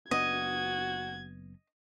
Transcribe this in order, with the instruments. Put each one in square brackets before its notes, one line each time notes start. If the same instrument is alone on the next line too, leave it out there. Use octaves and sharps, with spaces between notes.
[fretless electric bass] F#1 B3 D4 [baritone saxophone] F#4 [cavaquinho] D#5 [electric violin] G#6